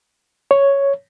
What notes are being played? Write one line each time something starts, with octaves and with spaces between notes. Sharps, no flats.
C#5